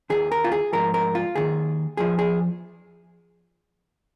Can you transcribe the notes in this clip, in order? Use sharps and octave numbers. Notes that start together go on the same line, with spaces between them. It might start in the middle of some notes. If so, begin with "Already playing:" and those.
D#2 D#3 G#4
A#4
F4
G#4
G#2 F3 A#4
A#4
F4
D#2 D#3 G#4
F2 F3 G#4
G#4